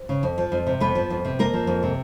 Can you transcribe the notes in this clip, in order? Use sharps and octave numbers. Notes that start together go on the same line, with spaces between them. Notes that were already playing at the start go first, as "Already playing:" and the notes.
Already playing: C5
C#3
F2
F3
F2
C3
F2 B3 B4
F3
F2
C3
F2 A#3 A#4
F3
F2
C3